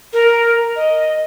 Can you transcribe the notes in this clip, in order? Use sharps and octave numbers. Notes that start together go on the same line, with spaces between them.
A#4
D#5